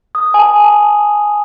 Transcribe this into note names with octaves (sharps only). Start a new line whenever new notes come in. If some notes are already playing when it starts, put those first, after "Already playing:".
D#6
G#5
A5
A5